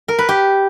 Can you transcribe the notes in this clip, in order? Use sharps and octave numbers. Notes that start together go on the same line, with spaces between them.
A#4
B4
G4